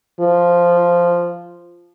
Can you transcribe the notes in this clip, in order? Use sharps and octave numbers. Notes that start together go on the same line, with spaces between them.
F3